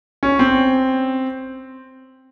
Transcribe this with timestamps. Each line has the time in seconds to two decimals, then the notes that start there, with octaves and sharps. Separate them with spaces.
0.23 C#4
0.39 C4